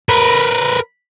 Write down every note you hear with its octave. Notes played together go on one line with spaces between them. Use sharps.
A#4 B4